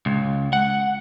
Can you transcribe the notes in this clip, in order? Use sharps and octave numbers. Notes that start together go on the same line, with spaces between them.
C#2
F#5